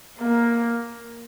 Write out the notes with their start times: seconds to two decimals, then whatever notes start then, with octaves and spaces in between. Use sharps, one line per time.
0.18 A#3